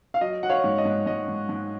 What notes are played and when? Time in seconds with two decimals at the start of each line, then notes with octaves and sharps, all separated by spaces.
0.14 F5
0.21 F#3 D#5
0.43 F#3 F#5
0.49 C#5 F5
0.64 G#2
0.78 D#5
0.85 G#2
1.06 G#2 D#5
1.28 G#2
1.49 G#2